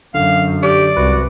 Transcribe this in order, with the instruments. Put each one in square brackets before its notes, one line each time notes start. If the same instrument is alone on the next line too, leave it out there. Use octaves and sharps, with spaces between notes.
[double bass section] F#2 [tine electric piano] D3 [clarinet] F5
[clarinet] G4 [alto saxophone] D5
[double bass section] C2 [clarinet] F#4 [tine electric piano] B4